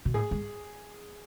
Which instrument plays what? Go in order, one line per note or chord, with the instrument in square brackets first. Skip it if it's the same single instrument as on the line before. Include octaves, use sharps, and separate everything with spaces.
[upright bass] B2
[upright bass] A2 [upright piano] G#4
[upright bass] G#2